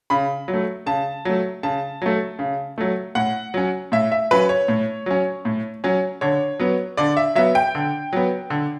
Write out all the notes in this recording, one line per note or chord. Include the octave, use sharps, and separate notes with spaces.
C#3 B5
F#3
A3
C#3 A5
F#3 A3
C#3 A5
F#3 A3
C#3
F#3 A3
A2 F#5
F#3 C#4
A2 E5
E5
F#3 C#4 B4
C#5
A2
F#3 C#4
A2
F#3 C#4
D3 C#5
F#3 B3
D3 D5
E5
F#3 B3 E5
G5
D3
F#3 B3
D3